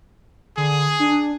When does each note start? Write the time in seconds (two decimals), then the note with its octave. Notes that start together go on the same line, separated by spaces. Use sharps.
0.57 D3 G#4
1.00 D4